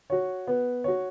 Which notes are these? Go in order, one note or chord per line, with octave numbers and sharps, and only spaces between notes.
F#4 C#5
B3
F#4 C#5